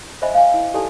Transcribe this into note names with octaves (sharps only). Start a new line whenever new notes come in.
C5 D#5 E5 G#5 B5
F5 G#5
E4
G4 A4 D5 G#5 A5